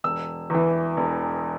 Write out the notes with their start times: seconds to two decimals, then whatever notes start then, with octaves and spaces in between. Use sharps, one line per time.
0.04 E1 E6
0.50 E2 E3
0.97 E1